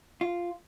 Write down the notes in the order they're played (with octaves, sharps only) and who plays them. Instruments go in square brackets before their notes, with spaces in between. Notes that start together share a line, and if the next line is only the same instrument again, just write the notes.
[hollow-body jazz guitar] F4